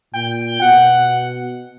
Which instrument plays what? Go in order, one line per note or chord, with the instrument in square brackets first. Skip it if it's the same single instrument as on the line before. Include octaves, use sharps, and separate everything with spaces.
[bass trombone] A#2 [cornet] G5
[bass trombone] B2 [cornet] F#5